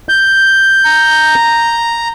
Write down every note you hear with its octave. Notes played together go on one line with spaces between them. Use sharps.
G6
A#5